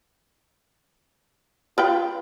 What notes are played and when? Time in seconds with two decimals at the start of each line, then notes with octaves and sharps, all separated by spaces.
1.78 F4 A#4 B4 G5